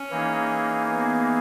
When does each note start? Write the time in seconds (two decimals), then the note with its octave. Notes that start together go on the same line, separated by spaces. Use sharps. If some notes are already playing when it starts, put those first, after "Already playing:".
Already playing: C#4
0.10 E3 A#3 D#4 G#4
0.90 B3